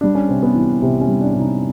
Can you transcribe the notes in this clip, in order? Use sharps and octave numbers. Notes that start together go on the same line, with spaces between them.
G3 D4
C#4
C3 C4
B3
E3
C3 C4
C#4
G3
D4
C3
D#4